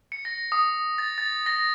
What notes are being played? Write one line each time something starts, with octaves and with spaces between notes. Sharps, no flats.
C#7
A#6
D#6
A6
A6
A#6